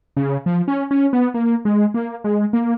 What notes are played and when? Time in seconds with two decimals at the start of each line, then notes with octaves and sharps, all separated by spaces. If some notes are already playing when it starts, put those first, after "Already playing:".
0.17 C#3
0.46 F3
0.68 C#4
0.91 C#4
1.13 B3
1.34 A#3
1.65 G#3
1.94 A#3
2.24 G#3
2.53 A#3